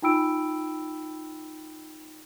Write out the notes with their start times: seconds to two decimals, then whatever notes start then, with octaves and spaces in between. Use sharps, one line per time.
0.02 D#4 F4 G5 B5 E6 D7